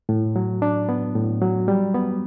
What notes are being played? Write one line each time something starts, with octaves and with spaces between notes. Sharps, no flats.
A2
F#3
D4
B3
A2
F#3
G3
B3